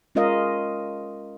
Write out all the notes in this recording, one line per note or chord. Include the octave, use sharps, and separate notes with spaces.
G#3 C#4 F4 A#4 D#5 F5